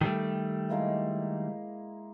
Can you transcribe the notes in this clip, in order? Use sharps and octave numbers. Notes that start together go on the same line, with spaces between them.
D#3 G3 A3
G#3 A#3 E4